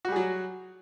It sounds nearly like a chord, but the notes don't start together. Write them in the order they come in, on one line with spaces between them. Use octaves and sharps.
F#4 G3 G#4 F#3